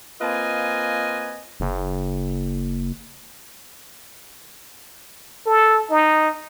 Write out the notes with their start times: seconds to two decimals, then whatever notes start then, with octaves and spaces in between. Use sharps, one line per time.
0.21 A#3 C4 F4 B4 D#5 G#5
1.60 F#1
5.47 A4
5.91 D#4